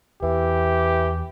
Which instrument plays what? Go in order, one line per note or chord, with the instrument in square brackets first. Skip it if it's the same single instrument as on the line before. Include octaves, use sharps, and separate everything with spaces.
[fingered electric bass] E2 [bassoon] E3 [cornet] G4